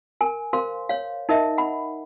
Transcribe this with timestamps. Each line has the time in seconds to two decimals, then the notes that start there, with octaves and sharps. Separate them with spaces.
0.21 A#4 G#5
0.53 A#4 C5 F5 C6
0.89 C#5 F5
1.29 D#4 A#4 D#5 E5
1.58 F#5 B5